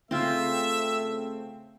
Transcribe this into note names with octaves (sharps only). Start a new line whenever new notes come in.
C#3 A3 C4 F4 E5 C6